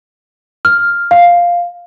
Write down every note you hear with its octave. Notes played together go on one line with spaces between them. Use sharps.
F6
F5